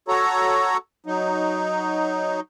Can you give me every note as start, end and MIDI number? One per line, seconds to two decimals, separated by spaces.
0.08 0.77 66
0.08 0.77 69
0.08 0.77 73
0.08 0.77 82
1.06 2.40 54
1.06 2.40 63